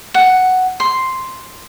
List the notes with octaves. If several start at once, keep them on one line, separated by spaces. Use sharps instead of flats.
F#5
C6